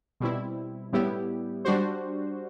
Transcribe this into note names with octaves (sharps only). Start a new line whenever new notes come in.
B2 G3 C4 E4
A2 G3 B3 E4 G4
G3 D4 F#4 C5